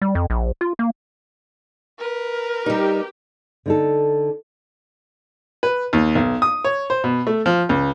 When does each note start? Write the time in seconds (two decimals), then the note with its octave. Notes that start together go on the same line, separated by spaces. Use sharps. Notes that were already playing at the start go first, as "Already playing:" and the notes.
0.02 G3
0.15 F2
0.30 A#1
0.61 F4
0.79 A#3
1.99 A#4 B4
2.66 G3 D#4 G4
3.66 D3 D#4 A4
5.63 B4
5.93 D#2
6.15 B1
6.42 D#6
6.64 C#5
6.90 C5
7.04 B2
7.27 A3
7.46 F3
7.69 C#2